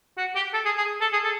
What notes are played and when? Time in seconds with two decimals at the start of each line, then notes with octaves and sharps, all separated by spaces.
0.18 F#4
0.35 G4
0.54 A4
0.65 G#4
0.77 G#4
1.01 A4
1.13 G#4
1.24 A4